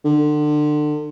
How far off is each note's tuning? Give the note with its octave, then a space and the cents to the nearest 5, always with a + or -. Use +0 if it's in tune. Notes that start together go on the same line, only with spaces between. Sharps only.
D3 +30